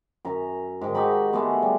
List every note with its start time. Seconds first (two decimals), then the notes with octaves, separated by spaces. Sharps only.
0.25 F#2 A#5
0.81 G#2 D#3
0.95 D#4 F#4 G4 B5
1.33 G#3 A3 B3
1.63 G3